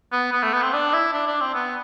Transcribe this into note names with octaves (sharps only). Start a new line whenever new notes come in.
B3
B3
A3
B3
C4
D4
E4
D4
D4
C4
B3